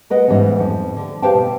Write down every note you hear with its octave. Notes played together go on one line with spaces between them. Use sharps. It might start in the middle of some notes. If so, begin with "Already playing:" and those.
A#4 B4 D#5 F#5
G#2 B2 E3 G3 B3 C#4
F2
D3
G4 B4 C5 F5 G5 A5
B2